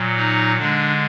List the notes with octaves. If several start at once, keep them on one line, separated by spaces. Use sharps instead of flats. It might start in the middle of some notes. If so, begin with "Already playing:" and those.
Already playing: A#2 F#3
D#4
D3 G#3 D4